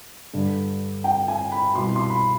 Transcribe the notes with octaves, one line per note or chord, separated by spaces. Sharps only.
G2 D3
G5
G#5
B5
C2 B2 C6
C6
B5